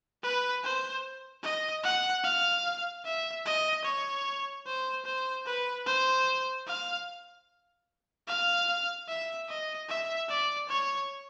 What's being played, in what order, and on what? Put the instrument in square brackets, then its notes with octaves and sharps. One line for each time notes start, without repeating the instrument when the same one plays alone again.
[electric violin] B4
C5
D#5
F#5
F5
E5
D#5
C#5
C5
C5
B4
C5
F5
F5
E5
D#5
E5
D5
C#5